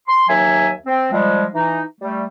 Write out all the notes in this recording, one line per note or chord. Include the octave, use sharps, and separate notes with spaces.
C6
D#2 F#3 E5 G#5
C4
F3 G3 G#3
E3 D#4
G3 A3